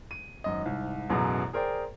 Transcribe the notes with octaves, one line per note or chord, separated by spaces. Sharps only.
D#7
G#1 F#2 D#5
C2 G#2
A1 F#2 B2 F#3 G#4 A#5
G#4 A#4 C5 D5 G5